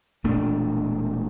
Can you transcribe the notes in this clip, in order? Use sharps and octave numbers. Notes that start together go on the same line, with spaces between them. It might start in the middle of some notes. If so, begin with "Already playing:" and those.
E1 A#2 A3 D4